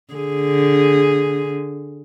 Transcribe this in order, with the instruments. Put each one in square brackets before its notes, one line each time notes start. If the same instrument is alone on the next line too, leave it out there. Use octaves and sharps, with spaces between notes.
[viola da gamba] D3 G#4